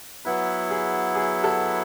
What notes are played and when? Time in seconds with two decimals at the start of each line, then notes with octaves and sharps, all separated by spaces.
0.25 F#3 B3 E4 B4
0.70 G#4
1.15 G#4
1.44 A4